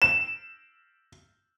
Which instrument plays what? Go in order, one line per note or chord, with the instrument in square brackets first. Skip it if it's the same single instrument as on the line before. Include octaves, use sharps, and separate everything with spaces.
[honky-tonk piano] E7